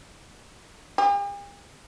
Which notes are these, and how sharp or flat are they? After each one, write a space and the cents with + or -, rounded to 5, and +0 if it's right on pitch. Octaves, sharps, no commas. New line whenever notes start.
G4 +45